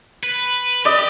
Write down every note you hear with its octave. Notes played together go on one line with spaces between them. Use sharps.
B4
G4 D5 D#5